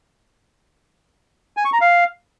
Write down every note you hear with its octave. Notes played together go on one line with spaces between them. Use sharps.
G#5
C#6
A#5
F5